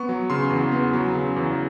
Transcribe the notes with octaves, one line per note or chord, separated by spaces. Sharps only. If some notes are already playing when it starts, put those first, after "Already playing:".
Already playing: B3 C#6
F#3
C#3 C6
E2
B3
F#3
C#3
E2